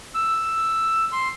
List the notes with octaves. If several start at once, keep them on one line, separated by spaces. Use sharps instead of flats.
E6
C6